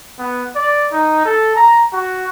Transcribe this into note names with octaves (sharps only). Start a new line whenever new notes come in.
B3
D5
D#4
A4
A#5
F#4